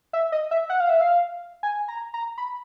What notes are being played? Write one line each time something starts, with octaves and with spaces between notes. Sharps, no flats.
E5
D#5
E5
F#5
F5
E5
F5
G#5
A#5
A#5
B5